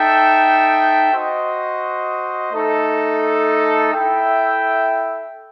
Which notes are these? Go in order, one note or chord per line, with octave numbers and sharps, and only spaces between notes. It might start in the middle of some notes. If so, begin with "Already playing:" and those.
Already playing: D#4 A4 E5 G5
F#4 C5 D#5
A3 D#4 A4
E4 A4 E5 G5